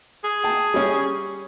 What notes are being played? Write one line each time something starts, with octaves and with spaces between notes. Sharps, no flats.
G#4
G5 A5
G3 C#4